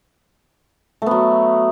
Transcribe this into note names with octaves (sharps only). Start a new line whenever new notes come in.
F#3 A3 B3